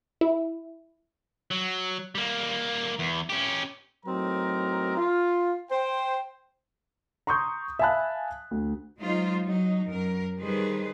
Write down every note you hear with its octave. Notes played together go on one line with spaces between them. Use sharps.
E4
F#3
G3 A#3
E2
C#4 G4
A2 F#3 C4 D#4 A#4 A#5
F4
C5 G5
A#5 C6 C#6 D#6 G6
E5 F5 G#5 A5 B5 F#6
D2
F#3 G#3 D#4 F4 C5
F#3 D#4
F#2 A#4
D#3 G3 G#4 B4 C5